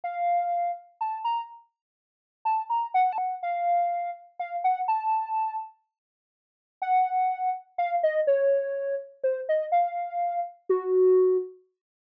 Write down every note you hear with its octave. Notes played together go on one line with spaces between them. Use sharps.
F5
A5
A#5
A5
A#5
F#5
A5
F#5
F5
F5
F#5
A5
F#5
F5
D#5
C#5
C5
D#5
F5
F#4